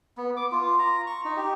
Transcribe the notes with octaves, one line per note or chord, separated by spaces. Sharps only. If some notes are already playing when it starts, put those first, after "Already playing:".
B3
D6
F4
A#5
C#6
D#4
G4